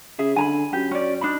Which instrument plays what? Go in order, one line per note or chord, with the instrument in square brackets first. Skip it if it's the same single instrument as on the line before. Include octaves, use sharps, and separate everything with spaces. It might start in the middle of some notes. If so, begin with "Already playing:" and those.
[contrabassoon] C#3 [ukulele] G#4 E5
[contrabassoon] D3 [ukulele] G#5 A#5 B5
[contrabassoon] F#2 [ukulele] G4
[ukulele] C#4 D5
D4 D#4 B5